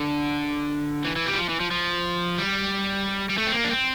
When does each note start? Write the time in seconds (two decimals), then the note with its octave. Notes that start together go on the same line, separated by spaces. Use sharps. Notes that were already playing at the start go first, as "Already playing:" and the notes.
Already playing: D3
1.04 E3
1.16 E3
1.26 G3
1.33 E3
1.37 F3
1.49 E3
1.60 F3
1.71 F3
2.38 G3
3.29 G3
3.37 A3
3.47 C4
3.54 A#3
3.64 D4
3.71 C4